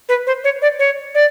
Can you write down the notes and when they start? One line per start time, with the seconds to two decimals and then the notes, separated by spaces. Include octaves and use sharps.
0.09 B4
0.27 C5
0.44 C#5
0.62 D5
0.79 C#5
1.15 D5